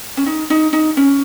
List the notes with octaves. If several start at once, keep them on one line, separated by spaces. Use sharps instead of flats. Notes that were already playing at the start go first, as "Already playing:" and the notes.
C#4
D#4
D#4
D#4
C#4